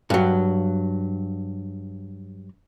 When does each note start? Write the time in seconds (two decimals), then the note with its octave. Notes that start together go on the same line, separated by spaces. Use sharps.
0.10 G2 F#3